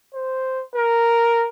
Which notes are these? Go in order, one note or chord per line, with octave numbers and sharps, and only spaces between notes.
C5
A#4